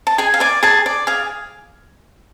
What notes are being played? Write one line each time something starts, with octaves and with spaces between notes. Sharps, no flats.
A5
G#4 G#5
F5
D5 G#5
G#4 A5
D5
G#4 F5